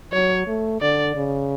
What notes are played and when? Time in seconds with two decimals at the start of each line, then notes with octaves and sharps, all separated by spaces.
0.12 F#3 C#5
0.47 A3
0.81 D3 D5
1.16 C#3